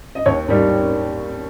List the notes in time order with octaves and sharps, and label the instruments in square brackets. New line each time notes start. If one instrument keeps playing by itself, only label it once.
[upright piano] D#5
D#2 C#5
D#3 G3